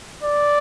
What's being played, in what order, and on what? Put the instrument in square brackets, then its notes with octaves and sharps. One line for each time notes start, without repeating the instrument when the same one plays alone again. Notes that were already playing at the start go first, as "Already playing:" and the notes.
[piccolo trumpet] D5